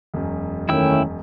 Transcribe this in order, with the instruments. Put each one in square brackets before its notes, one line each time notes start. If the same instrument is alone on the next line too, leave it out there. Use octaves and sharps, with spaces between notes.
[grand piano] E1 F#2
[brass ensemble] D#3 A3 C#4 [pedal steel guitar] E4 G5 E6